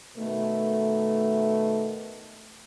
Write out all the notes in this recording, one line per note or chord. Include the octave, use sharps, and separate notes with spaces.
B2 D#3 A3